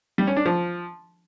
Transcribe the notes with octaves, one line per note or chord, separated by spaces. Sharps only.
G3
C#4
D4
F3